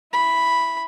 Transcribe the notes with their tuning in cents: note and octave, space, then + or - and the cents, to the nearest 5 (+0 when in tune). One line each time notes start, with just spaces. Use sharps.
E4 +0 B5 +0